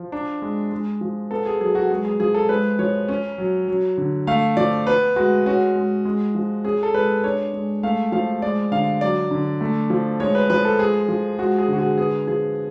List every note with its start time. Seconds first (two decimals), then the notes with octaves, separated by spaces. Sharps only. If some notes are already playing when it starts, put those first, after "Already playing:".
Already playing: F3
0.12 D4
0.42 G#3
0.72 G#3
1.01 F3
1.31 B3 A4
1.46 G#4
1.60 F#3 G#4
1.75 F#4
1.90 G#3 G#4
2.05 G#4
2.20 F3 G#4
2.34 A4
2.49 G#3 B4
2.79 F3 C#5
3.08 C#4
3.38 F#3
3.68 F#3
3.98 D3
4.27 A3 F5
4.57 F3 D5
4.87 B3 B4
5.16 G#3 F#4
5.46 C#4 F#4
5.75 G#3
6.05 G#3
6.35 F3
6.64 C#4 G#4
6.83 A4
6.94 G#3 B4
7.24 D4 C#5
7.53 G#3
7.83 A3 F5
8.12 F3 F5
8.42 G#3 D5
8.72 D3 F5
9.01 F#3 D5
9.31 D3
9.61 A3
9.90 F3
10.20 G#3 C#5
10.35 B4
10.50 F3 B4
10.65 A4
10.79 G#3 G#4
11.08 F3
11.39 G#3 F#4
11.58 G#4
11.68 D3 F#4
11.78 G#4
11.98 B3 G#4
12.27 F3 G#4